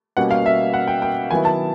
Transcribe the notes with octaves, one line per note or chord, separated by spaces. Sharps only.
B2 G3 A#3 C#4 F#5
F5
E5
F#5
G5
G5
D#3 F#3 B3 E4 G#5
A5